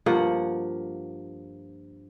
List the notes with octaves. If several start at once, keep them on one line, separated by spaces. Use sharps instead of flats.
G2 F3 A#3 F#5